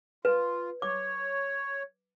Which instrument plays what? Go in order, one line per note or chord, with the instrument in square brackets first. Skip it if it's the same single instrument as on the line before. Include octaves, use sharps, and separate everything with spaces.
[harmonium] F4 [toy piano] B4
[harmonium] C#5 [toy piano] D6